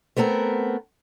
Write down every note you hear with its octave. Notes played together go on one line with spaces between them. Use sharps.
A3 B3 C4 A4 A#4